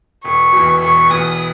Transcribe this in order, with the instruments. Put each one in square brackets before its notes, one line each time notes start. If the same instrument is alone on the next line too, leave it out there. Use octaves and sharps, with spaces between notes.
[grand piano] E1 [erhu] C#6
[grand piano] E2 B2
[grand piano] E1 [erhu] C#6
[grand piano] E2 B2 [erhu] D#6